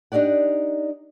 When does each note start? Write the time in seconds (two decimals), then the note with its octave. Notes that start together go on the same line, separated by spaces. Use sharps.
0.12 D4 D#4 G4 D5 F#5